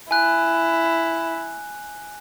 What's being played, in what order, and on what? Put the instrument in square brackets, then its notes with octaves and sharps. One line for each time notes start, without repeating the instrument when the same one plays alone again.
[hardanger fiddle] E4 [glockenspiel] G#5 F#6